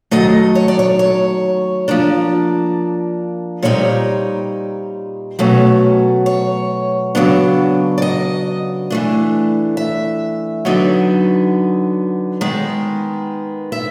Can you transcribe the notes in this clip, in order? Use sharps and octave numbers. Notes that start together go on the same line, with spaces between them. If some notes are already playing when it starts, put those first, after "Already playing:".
D#3 F#3 A3 D#5
C#5
D5
C#5
C#5
F3 A#3 D4
A#2 G3 C4 D#4 C#5
B2 F#3 A3 C#4
C#5
C#3 F#3 B3 D4
D5
D#5
E3 A3 D4
E5
D3 F#3 B3 D#4
D#3 G#3 B3
E5